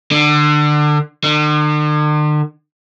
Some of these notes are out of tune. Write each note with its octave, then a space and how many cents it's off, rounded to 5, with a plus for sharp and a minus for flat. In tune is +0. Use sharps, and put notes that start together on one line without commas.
D3 +25
D3 +45